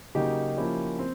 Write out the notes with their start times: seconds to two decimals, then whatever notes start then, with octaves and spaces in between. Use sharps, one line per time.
0.15 C#3 F#3 A#3 D#4 G4
0.57 F3 A#3 C#4 E4 G4
0.99 C4